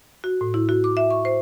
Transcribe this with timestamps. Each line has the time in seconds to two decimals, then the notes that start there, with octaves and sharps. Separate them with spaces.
0.24 F#4
0.41 A2
0.54 E4
0.69 F#4
0.84 D6
0.97 E5
1.11 C#6
1.25 C5